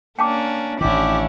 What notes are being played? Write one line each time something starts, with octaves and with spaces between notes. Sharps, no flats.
A#3 C#4 D4 G5 A5 D6
A1 D#3 C#4 D4 E4 G4